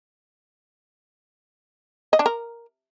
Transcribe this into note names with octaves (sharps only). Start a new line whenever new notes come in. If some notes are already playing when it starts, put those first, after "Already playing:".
D#5
D4
A#4